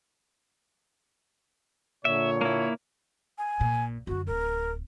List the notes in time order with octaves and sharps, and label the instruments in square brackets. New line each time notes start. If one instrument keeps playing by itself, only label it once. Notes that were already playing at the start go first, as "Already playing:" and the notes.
[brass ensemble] A#2 D3 C#5 [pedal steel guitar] E5
[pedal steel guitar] A#3 E4
[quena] G#5
[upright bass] A#1 A#2
[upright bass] F#2 D3 [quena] F#4
[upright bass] D1 [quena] A#4